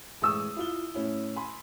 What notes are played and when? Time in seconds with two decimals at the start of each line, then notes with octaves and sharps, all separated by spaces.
0.22 A1 G#3 C#6 D#6 E6
0.56 E4 F4 G7
0.94 A2 C#4 E4
1.36 G#5 B5 C6